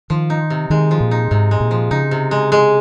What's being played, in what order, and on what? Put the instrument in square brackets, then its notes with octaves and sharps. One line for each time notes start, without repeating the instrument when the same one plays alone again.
[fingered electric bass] D#3 [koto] F3
[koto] D#4
C3
[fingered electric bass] D#3 [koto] G#3
[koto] F3
[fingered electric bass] A#2
[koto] D#4
[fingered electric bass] G#2 [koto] C3
[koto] G#3
[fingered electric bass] A#2
[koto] F3
[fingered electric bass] C#3 [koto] D#4
[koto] C3
G#3
G#3